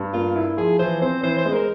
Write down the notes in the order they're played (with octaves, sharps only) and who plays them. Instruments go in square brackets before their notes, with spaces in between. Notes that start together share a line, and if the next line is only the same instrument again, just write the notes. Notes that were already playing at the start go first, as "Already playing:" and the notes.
Already playing: [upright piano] G2
[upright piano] A#3 [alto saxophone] F4
[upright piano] E4
[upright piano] F3 [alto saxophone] G#4
[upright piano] E3 [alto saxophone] C5
[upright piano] C4 [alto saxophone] C5
[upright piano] E3 [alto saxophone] C5
[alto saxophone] C5
[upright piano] G#3
[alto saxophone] A#4